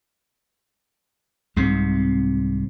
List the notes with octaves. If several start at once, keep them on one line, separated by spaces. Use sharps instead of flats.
C2 G#2 C3